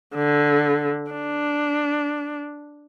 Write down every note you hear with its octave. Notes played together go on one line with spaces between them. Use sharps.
D3
D4